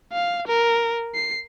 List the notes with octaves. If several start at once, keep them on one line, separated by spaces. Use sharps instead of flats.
F5
A#4
C7